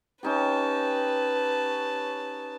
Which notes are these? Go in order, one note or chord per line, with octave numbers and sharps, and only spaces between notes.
C#4 D#4 G4 B4 A5